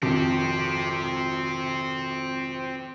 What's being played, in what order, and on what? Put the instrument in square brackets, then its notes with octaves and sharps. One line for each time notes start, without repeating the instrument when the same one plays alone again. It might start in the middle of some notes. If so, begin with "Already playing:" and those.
[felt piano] G#1 F2 [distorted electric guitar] C4 G4